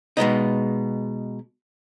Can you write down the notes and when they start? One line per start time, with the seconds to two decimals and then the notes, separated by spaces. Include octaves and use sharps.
0.17 B2 G#3 B3 D#4